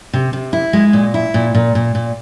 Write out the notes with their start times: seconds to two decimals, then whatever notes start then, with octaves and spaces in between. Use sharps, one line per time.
0.13 C3
0.33 C3
0.53 E4
0.73 G#3
0.93 A#2
1.14 E4
1.34 A#2
1.55 A#2
1.75 A#2
1.95 A#2